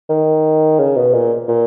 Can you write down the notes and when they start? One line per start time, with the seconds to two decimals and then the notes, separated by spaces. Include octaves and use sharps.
0.09 D#3
0.79 C#3
0.96 B2
1.14 A#2
1.49 A#2